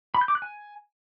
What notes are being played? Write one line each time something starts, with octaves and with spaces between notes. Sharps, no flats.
B5
G6
D6
F#6
G#5